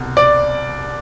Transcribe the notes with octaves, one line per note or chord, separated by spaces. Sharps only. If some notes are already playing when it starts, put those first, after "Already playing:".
Already playing: C2 B2
D5